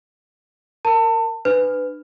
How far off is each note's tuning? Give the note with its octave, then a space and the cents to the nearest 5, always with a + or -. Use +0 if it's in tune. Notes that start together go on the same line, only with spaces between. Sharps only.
A#4 -15 A5 +30
D4 +30 B4 +20